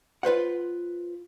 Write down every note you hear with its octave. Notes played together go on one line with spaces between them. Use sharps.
F4 B4 C5 F#5